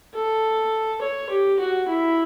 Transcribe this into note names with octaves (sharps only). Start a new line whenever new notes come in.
A4
C#5
G4
F#4
E4